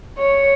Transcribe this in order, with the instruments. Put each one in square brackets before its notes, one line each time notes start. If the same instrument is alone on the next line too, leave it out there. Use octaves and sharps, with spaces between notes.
[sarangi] C#5